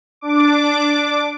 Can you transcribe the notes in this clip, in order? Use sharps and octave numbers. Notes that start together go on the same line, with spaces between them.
D4 D6